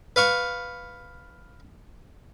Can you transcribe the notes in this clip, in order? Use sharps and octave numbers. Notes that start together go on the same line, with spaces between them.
B4 F5 C#6